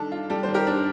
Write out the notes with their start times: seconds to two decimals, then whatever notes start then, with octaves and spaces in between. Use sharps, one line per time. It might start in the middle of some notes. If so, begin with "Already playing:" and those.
Already playing: D#3 G3 D4 A4
0.12 F4
0.30 G3 A4
0.43 C5
0.48 D#3
0.54 G4 A#4
0.67 D4